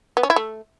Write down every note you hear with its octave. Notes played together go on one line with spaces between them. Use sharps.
B3
C#4
E4
A3